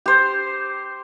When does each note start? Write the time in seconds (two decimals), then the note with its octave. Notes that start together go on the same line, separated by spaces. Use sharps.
0.06 G4 C5